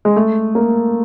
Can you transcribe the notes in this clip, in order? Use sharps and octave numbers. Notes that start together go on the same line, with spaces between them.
G#3
A3
A#3